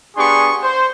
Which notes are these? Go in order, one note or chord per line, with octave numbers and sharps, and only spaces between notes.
B3 D4 G4 G#4 C6 C#6
C5